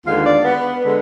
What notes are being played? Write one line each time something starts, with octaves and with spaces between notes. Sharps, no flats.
D#2 D3 G#3 B3 F4 F5
D4 D5
B3 B4
D3 G#3